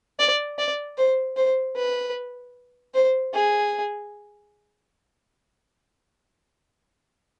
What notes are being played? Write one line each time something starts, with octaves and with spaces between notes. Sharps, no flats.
D5
D5
C5
C5
B4
C5
G#4